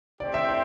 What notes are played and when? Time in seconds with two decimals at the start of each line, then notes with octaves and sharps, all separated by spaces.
0.20 A3 C4 G4 C5 D5
0.34 E5
0.48 D5